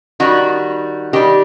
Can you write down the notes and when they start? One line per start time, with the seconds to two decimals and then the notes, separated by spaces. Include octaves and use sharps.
0.20 D#3 G3 F#4
1.13 D#3 G3 G4